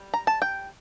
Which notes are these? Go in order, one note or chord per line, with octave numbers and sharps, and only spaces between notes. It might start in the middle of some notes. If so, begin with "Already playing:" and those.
Already playing: G3
A#5
A5
G5